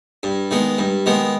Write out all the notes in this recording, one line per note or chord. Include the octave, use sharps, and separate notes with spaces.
G2
D#3 G#3 B3
G2
D#3 G#3 B3